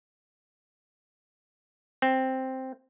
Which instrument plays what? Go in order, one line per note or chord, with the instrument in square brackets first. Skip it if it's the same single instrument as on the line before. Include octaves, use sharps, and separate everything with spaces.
[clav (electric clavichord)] C4